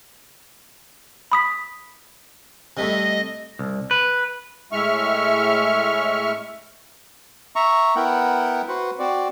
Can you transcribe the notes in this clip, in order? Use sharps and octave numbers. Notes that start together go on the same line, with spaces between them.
B5 D#6 B6
C3 G3 A3 D#5
C2
B4
A2 G#3 E5 C#6 F6
E5 A#5 C#6
B3 E4 A#4 F#5 G5
F#4 B4 C5 F#5
C4 F#4 D5